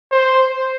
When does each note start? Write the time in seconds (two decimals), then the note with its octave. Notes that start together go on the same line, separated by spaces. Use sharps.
0.11 C5